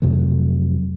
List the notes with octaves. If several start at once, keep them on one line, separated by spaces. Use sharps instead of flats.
F2 C3 F#3 A3